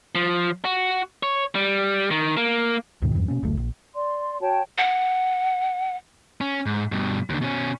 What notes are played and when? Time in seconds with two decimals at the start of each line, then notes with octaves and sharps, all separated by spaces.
0.15 F3
0.65 F#4
1.23 C#5
1.55 G3
2.11 D#3
2.37 A#3
3.02 D2 G#2 B2 D#3
3.15 E2 G2
3.28 B2 A#3 C#4
3.43 F#1 D2 A3
3.57 A#1
3.95 D5 C6
4.41 F#4 C#5 G5 A5
4.78 F#5
6.41 C#4
6.66 G#2
6.92 G2 B2
7.30 D#2 D3
7.41 B2 C#4